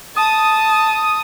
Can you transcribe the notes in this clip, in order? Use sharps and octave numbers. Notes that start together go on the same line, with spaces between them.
A5 D#6